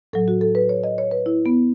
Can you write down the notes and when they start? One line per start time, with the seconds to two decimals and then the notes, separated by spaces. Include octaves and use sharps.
0.13 A2 F#3 A4
0.28 F#4
0.41 A4
0.55 B4
0.69 C#5
0.84 D#5
0.98 C#5
1.11 B4
1.26 E4
1.46 B3